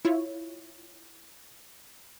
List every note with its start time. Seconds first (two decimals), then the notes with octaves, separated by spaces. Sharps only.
0.05 E4 F4 C#5